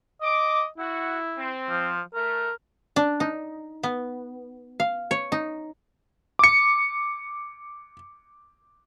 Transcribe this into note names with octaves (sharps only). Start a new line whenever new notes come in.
D#5 D6
E4 F#4 F#5
C4
F3
A3 A#4
D4
D#4
B3
F5
C#5
D#4
D6 C#7